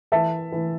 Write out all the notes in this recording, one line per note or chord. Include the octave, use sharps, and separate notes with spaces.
E3 E5 A5
E3